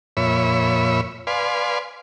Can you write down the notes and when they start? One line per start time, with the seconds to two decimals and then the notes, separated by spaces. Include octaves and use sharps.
0.17 F2 A#2 C#5 E5 B5
1.27 B4 D5 F5 G#5 C6